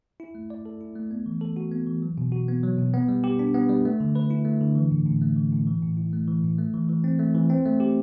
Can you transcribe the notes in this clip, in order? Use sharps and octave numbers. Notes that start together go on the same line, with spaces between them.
E4
A3
D5
A4
E4
A3
B3
E3
A4
F#4
B3
E3
F#3
B2
F#4
B3
F#3
B2
B3
G3
G4
D4
B3
G3
A3
D3
B4
E4
A3
D3
E3
A2
A2
A3
E3
A2
E3
A2
E4
A3
E3
A2
A3
E3
E3
C4
A3
E3
C4
A3
G4